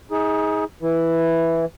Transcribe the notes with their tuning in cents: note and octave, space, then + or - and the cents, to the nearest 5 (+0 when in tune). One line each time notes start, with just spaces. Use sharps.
D#4 +30 G#4 +0
E3 +0 E4 +0